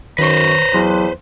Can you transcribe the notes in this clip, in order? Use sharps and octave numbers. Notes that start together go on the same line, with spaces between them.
F#2 D#3 B4 C5 A#5 C#6
E2 F#3 C6 F#6